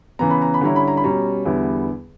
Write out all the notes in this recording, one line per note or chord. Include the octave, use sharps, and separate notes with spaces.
C#3 E3 B3 A#5
B5
A#5
B5
D3 G3 C#4 E4 A#5
B5
A#5
B5
B2 G3 C#4 A#5
E2 D3 G3 B3 E4